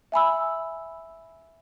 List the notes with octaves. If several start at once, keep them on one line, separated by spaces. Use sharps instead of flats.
E5 G#5 B5 E6